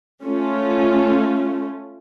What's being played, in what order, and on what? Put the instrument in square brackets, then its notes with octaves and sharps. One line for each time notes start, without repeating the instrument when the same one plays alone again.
[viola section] A3 C#4 F4